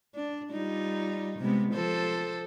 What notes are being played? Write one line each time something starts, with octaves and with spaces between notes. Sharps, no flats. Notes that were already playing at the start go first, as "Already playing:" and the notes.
D4
G3 D#4 F4
C3 G#3 B3
F3 A4 C5